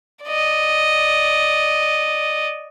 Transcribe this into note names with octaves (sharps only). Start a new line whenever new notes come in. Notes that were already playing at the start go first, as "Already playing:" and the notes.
D5 D#5